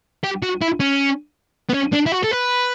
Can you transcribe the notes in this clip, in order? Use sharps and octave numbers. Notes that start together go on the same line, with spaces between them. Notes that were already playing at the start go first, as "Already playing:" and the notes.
G4
F#4
E4
C#4
B3
C#4
D4
E4
F#4
A4
B4